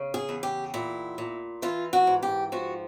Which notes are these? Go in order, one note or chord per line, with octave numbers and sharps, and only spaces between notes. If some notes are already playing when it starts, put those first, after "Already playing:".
Already playing: C#3
G#4
E2
G4
A#2 E4
A#2
E3 F4
F#4
G#2
G4
F3 F#4